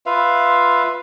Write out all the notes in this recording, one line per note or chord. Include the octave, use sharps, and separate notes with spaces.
F4 B4 E5 F5